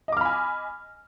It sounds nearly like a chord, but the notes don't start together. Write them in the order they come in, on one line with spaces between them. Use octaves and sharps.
D#5 D6 F6 B5 G#5